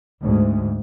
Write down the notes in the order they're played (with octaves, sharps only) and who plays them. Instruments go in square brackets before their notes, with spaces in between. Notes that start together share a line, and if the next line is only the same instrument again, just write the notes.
[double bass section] D2 G#2